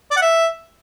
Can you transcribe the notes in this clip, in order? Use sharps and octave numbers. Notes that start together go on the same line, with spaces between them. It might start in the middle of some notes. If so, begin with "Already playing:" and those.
D5
F#5
E5